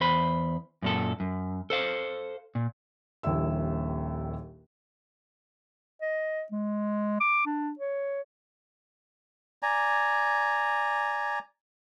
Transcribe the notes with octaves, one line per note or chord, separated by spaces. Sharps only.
E2 C5 B5
F#2 A#2 A4
F#2
A4 C5 F5
A#2
D#1 A#1 D#2 D#3 E4 E6
D#5
G#3
D6
D4
C#5
D5 G#5 A#5